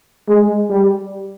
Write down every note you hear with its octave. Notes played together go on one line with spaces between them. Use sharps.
G#3
G3